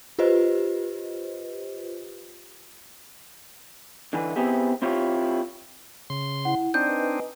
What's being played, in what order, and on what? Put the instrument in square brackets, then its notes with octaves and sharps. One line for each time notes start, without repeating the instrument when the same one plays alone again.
[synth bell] F4 G4 B4 C5 D#5
[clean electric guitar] D3 E3 B4
B3 C4 E4 G4 G#4
C4 E4 F4 G4 C#5
[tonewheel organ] C#3 C6
[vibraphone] E4 [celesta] F#5
[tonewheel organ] C4 D4 D#4 [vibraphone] D5 [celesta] G6
[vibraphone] B4 D#5 G#5